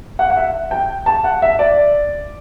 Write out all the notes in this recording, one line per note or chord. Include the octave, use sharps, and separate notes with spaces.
F#5
F#5
E5
G5
A5
F#5
E5
D5